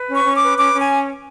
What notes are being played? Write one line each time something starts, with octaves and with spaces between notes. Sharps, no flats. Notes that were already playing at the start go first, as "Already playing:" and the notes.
Already playing: B4
C#4
C#6
C#4
D6
B4
C#4 D6
C#4 G#5